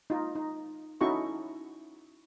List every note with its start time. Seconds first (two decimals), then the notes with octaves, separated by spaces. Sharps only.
0.10 D#4 F4
0.35 D#4
1.01 C#4 D#4 E4 F#4 A4 C#6